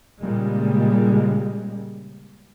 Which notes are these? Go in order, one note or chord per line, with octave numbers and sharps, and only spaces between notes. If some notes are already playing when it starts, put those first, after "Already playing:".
A#2 C#3 G3 G#3